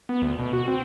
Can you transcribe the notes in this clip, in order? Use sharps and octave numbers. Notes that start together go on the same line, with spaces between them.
B3
D2
B2
F#4
C4